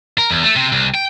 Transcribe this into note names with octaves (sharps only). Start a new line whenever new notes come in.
A#4
E2
A3
C3
C2
G5